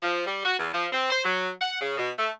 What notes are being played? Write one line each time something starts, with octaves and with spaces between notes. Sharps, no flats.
F3
G3
F#4
E2
F3
C4
C5
F#3
F#5
C#3
B2
A3